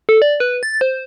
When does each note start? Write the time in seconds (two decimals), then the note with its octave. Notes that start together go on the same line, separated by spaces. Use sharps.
0.09 A4
0.22 D5
0.40 B4
0.63 A6
0.81 C5